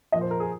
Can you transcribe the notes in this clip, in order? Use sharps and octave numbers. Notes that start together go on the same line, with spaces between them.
A#2 F3 D#5
C5
A#4
G#4